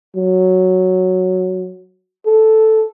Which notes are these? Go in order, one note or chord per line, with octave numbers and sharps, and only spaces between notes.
F#3
A4